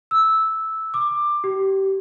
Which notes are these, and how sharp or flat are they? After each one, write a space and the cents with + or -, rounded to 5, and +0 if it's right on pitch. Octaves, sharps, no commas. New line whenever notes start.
E6 -10
D6 +15
G4 -20